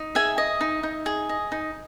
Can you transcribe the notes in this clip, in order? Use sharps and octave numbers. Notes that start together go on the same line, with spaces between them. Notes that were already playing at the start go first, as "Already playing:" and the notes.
Already playing: D#4
G#4 E5 G#5
D#5
D#4
D#4
G#4
D#5
D#4